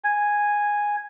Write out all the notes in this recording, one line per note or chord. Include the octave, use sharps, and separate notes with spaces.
G#5